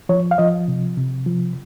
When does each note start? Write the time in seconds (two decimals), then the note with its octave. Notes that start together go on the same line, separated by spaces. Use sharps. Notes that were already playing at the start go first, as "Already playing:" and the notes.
0.09 F3 C#5
0.31 F5
0.38 F3 D#5
0.68 C3
0.97 C3
1.27 F3